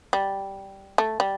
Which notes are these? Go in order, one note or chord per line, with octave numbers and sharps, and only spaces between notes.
G3
A3
G3